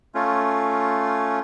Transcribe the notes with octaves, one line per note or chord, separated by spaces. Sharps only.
A3 C#4 F4